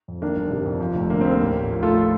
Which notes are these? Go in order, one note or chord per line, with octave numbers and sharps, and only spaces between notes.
F2
D#3 A#3 D4
G1
C3
F2
F3
F1
D3 A#3
D#2 C4
A#3
A1
A1
F3
A2 F4 A4